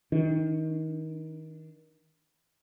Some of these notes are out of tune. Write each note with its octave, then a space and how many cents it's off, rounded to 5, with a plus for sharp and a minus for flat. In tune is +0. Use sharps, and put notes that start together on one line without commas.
D#3 +30 D4 +0